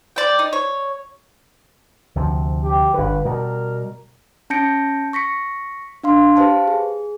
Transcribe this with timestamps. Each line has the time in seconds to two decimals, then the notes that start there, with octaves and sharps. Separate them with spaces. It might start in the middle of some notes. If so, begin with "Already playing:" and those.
0.16 D5 G5
0.39 D#4
0.53 C#5
2.15 D2 C3 F3
2.63 G4
2.94 G1 D3 B4
3.25 B2 G3 A#4
4.50 C#4 A5 G6 A#6 C#7 D7
5.13 C#6 A#6 B6 C#7
6.03 D4 F5 C6
6.36 G4 B4 C5 F5 A5
6.68 G#4